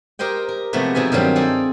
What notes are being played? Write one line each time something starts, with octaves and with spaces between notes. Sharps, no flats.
G4 A#4 C5 D#5 G5
A#4
C3 F3 G#3 A3 B3 F#4
B2 F3 D#4 E5 G#5
G2 D#3 F#3 G3 C4 F4
D#4 F4 G#4 A4 C5 D5